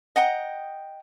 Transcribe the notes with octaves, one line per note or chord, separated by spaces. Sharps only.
D#5 F#5 G5 A#5